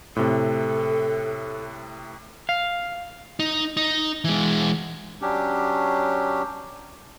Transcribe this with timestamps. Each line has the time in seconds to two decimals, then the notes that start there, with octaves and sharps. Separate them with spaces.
0.16 A2 C3 A4
2.49 F5
3.39 D#4
3.77 D#4
4.24 E3 G#3
5.22 F#3 C#4 D4 G4